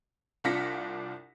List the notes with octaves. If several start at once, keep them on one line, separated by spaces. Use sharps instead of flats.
C2 D4 F4 A#6 B6 C#7